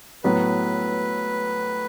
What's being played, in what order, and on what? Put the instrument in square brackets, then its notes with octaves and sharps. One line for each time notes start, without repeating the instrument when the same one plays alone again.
[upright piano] A2 F#3 B3 [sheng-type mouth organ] B4